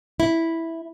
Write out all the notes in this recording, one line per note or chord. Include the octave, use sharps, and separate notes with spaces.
E4